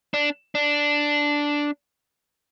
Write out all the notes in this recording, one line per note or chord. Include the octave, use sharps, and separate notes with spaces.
D4
D4